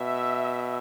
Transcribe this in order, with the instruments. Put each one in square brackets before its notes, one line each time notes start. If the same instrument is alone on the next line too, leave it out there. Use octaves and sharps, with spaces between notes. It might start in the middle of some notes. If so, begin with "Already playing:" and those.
Already playing: [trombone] B2 [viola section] E5